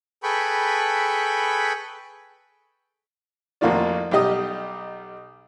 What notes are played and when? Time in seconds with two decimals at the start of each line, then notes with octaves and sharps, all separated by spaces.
0.23 G#4 A4 B4 G5 B5 C#6
3.61 A1 F2 A#3 F4 F#4 D5
4.11 B1 G3 G4 D#5 D#6